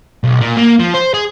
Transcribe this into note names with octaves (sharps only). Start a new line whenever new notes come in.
B1
A#2
A#3
F3
C5
G#4